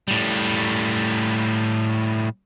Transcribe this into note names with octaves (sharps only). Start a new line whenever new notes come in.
A2 G3